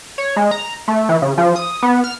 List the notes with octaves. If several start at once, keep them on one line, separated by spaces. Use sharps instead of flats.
C#5
G#3
A#5
A3
E3
C#3
F3
D#6
B3
F6